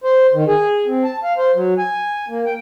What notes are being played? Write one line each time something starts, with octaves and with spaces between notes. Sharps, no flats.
C5
D#3
G#4
C4
A5
F5
C5
F#3
G#5
A#3
G5